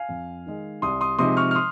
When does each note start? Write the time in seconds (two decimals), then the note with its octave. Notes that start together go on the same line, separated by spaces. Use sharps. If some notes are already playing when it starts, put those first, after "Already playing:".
Already playing: F5 G#5
0.09 F2
0.46 D#3 G#3
0.82 C2 C6 D#6
1.01 C6 D#6
1.18 C3 F3 G#3 D#4 C6 D#6
1.37 C#6 F6
1.51 F6
1.55 C6 D#6